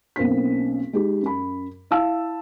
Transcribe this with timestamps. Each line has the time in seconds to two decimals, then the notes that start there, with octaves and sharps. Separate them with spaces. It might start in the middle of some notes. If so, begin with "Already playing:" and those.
0.16 B1 A#3 C4 C#4 B6
0.93 G#3 D#4 G4
1.22 F#2 B5
1.91 E4 F5 A5 E6